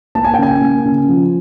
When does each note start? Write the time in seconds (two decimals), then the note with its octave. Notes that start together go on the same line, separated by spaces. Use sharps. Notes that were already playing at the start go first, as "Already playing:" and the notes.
0.15 A#3 A5
0.25 G#5
0.34 G5
0.38 C#3 G#5
0.61 A#3
0.85 C#3
1.08 F3